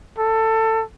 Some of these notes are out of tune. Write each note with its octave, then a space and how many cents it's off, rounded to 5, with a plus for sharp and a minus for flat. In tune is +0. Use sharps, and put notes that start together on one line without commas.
A4 +20